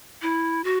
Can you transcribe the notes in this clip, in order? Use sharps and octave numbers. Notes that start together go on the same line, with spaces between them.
E4
F#4